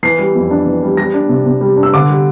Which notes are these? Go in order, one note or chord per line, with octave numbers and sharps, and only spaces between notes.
E3 C7
G3
F2
D4
E3
G3
G3 A#6
D4
C3
C3
G3
D4
E6
D3 D6
G3